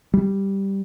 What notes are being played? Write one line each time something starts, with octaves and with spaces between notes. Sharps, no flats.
G3